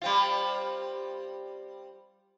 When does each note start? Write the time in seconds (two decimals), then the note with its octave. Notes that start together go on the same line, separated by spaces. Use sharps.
0.02 G3 C4 F4